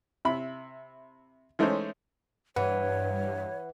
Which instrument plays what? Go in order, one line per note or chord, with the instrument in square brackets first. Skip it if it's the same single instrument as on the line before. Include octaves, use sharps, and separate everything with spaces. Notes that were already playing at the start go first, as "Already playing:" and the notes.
[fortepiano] C3 E4 B5
E3 G#3 A3 C#4 D#4 C5
[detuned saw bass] G2 [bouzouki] E3 [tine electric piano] B4 F#5 [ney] C#5